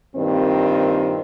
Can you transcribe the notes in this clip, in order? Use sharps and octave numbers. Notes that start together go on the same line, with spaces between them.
G2 A#2 D#3 C4